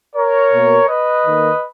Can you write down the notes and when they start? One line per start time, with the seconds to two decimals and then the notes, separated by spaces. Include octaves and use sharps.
0.15 A#4 C#5
0.51 B2 A#3
0.88 B4 D#5
1.25 D#3 A#3